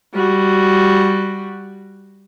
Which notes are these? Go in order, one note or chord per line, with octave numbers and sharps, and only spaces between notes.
G3 F#4